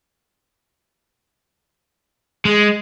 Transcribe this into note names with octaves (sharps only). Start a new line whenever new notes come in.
G#3